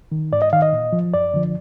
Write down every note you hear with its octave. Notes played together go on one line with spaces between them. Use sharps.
D#3
G#2 D5
D#5
D#3 F5
D#5
A#2
F3
F#2 D5
D3 F3